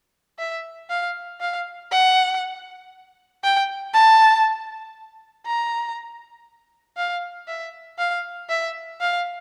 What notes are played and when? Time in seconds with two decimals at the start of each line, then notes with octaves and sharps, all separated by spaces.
0.39 E5
0.90 F5
1.41 F5
1.91 F#5
3.44 G5
3.94 A5
5.46 A#5
6.97 F5
7.48 E5
7.98 F5
8.49 E5
9.01 F5